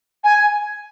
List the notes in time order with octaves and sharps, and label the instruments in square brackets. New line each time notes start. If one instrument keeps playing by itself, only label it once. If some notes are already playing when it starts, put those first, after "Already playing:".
[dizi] G#5